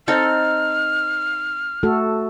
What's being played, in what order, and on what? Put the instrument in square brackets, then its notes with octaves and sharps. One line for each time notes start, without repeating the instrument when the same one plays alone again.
[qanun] C4 D#4 A4 [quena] F6
[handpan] A3 F#4 A4